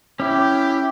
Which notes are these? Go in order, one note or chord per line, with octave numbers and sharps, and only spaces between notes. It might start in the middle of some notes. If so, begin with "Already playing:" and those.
C#4 E4 G4